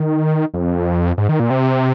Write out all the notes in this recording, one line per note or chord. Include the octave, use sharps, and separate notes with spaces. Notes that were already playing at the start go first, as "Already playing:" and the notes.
Already playing: D#3
F2
G#2
D#3
A#2
C3